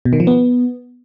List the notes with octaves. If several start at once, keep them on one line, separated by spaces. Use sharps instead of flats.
B2
D#3
F3
B3